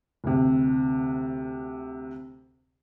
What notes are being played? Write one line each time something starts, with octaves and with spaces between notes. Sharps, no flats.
D2 C3